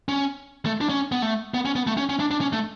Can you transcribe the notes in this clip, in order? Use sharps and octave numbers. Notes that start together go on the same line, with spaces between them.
C#4
A3
D4
C#4
B3
A3
B3
C#4
B3
A3
C#4
C#4
D4
D4
C#4
A3